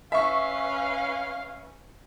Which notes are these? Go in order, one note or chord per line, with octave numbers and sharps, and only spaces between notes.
C#4 B4 E5 F5 C#6